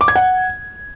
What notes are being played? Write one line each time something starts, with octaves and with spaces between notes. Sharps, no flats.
D6
G#6
F#5